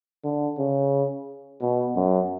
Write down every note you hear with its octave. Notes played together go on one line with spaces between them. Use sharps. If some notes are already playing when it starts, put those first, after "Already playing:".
D3
C#3
B2
F#2